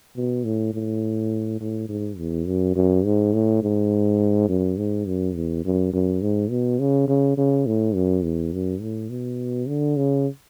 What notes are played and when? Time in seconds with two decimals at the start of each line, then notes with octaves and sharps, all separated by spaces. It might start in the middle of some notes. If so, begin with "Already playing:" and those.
0.16 B2
0.44 A2
0.74 A2
1.60 A2
1.89 G#2
2.18 E2
2.47 F#2
2.76 F#2
3.05 G#2
3.33 A2
3.62 G#2
4.48 F#2
4.77 G#2
5.07 F#2
5.35 E2
5.65 F#2
5.93 F#2
6.22 G#2
6.50 B2
6.79 C#3
7.08 C#3
7.37 C#3
7.66 A2
7.95 F#2
8.24 E2
8.53 F#2
8.81 A2
9.10 B2
9.68 D3
9.97 C#3